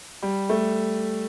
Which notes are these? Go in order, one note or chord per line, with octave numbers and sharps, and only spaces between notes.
G3
A3